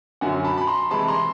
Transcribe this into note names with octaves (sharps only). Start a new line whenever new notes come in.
F#2 D3 F#3 F#5 G#5
A5 B5
B5
A#5 C6
C3 E3 G#3 A5 B5
A#5 C6